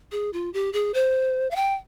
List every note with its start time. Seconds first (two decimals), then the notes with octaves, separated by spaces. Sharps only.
0.12 G#4
0.33 F4
0.53 G4
0.73 G#4
0.94 C5
1.51 F5
1.56 G5